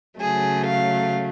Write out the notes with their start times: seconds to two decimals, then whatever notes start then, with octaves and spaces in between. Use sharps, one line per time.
0.19 C#3 F#3 A3 G#4
0.66 F5